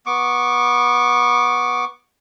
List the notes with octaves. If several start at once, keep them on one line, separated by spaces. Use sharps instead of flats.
B3 C#6 D6